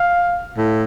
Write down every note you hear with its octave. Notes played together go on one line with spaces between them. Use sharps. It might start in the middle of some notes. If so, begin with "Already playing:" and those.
Already playing: F5
A2